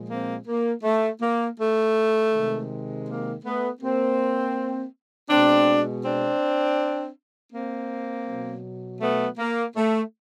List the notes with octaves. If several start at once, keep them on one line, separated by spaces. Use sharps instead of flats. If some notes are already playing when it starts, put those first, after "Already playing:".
Already playing: A#2 F3 G#3
A#3 C4
A#3
A3
A#3
A3
C3 D#3 G#3
A#3
A3 B3
A#3 C4
B2 G#3 C4 D4
C4 D4
A#3 C4
B2 F#3
A3 B3
A#3
A3